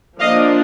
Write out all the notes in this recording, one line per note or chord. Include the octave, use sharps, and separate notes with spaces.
F3 A#3 D4 D#5 F5